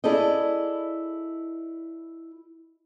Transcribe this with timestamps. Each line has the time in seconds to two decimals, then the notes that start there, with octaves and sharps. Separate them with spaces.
0.04 E4 G#4 A4 D5 D#5